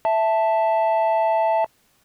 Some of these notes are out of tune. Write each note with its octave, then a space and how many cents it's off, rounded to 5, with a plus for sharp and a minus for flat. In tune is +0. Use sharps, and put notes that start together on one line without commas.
E5 +0 A5 +0